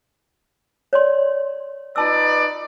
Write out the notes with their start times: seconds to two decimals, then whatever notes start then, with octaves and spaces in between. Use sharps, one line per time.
0.93 C#5 D5 C6
1.96 D#4 F4 B4 D5 A5 E6